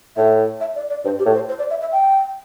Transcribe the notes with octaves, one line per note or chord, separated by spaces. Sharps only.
A2 E5
E5
D5
D5
G2 C5
G4
A2
C5
C5
D5
E5
E5
G5